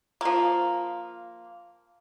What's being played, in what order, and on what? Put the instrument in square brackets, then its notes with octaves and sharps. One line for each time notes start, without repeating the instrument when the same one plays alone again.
[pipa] F3 A#3